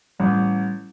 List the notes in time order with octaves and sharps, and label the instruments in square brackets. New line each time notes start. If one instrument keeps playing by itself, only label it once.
[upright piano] A1 [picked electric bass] G3